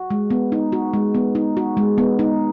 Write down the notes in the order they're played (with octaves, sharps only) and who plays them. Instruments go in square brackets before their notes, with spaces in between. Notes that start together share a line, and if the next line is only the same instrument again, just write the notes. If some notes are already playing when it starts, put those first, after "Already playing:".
Already playing: [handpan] F#4
G#3
B3
D#4
F#4
G#3
B3
D#4
F#4
G#3
B3
D#4